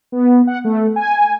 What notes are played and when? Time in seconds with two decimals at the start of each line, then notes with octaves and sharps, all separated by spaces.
0.12 B3
0.47 F#5
0.64 A3
0.96 G#5